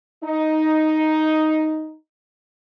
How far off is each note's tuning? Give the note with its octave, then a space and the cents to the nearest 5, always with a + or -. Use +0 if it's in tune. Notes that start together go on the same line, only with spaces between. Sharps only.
D#4 +5